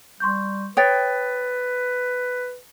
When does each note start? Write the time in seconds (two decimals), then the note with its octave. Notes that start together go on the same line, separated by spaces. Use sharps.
0.20 G3 C6 C#6 G6
0.77 B4 C#5 G5 D#6 A6